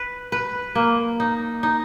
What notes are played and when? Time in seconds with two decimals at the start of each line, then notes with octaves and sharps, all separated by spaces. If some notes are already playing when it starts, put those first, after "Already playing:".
Already playing: B4
0.32 B4
0.75 A#3
1.20 D#4
1.63 D#4